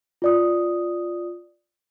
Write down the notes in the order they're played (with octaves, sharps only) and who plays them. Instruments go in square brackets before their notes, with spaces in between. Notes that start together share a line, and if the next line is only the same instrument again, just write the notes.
[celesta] F4 D5 D#6